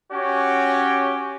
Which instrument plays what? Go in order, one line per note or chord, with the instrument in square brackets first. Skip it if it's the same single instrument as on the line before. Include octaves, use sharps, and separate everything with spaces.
[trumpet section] C#4 F#4 G4 C#5